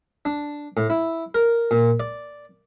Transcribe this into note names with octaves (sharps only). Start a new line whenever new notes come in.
D4
A2
E4
A#4
A#2
D5